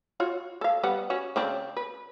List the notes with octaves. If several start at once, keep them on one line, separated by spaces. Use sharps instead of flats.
F4 F#4 C#5
A4 F5
G3 B3 F#5
C#4 F#4
C#3 C4 D4
B4